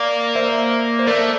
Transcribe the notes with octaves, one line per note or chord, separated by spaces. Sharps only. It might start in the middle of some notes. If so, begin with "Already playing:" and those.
Already playing: A#3 D5 F5
C5 E5
C5
A3 A#4 D5